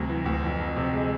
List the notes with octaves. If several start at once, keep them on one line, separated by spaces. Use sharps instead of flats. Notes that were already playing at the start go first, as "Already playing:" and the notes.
Already playing: D2 C3 F#3
E3
D2
F2
F2
C3
G#3